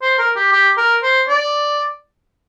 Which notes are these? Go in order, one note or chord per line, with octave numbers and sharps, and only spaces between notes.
C5
A#4
G4
G4
A#4
C5
D5